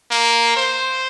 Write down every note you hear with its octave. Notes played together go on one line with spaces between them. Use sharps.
A#3
C5